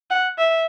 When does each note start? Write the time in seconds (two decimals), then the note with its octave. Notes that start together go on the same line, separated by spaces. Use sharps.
0.10 F#5
0.38 E5